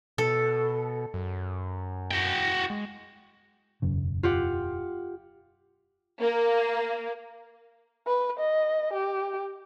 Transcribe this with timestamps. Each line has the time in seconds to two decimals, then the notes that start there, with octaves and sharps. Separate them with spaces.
0.18 B2 A4
1.14 F#2
2.11 F#4 G5
2.70 G#3
3.82 E1 F#2 C#3
4.23 F4 G4 F#5
6.20 A#3
8.07 B4
8.40 D#5
8.94 G4